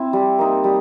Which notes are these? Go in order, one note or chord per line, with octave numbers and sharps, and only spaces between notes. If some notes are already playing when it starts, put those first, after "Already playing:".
Already playing: C4 E4
G3
A#3 D#4
G3